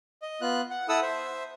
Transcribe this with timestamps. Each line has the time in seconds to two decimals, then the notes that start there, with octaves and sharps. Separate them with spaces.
0.22 D#5
0.41 B3 F4 F#6
0.71 F#5
0.89 E4 A4 F#5 D#6 E6
1.02 C5 E5